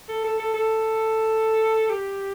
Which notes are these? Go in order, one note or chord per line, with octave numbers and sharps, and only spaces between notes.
A4
A4
A4
A4
G4